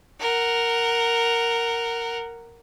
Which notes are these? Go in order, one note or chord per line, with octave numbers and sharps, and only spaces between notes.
A#4 F#5